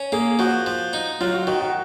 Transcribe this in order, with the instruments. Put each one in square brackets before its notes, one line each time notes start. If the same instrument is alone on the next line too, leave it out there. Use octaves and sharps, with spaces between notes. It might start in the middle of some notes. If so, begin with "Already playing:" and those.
Already playing: [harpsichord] C#4
[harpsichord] A#3 [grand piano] G#4
[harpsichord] F3 [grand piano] F#4
[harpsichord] F3
D#4
[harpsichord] F#3 [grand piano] F4
[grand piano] F#4
[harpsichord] D#3 [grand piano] F#4
[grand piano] F#4